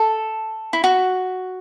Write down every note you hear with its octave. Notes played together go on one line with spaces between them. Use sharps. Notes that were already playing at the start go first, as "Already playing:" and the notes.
Already playing: A4
E4
F#4